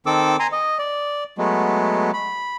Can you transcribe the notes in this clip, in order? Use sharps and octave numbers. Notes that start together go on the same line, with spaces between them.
D#3 C4 A4 D6 E6
G#5 A#5 C6
D#5
D5
F#3 G#3 A3 B3
B5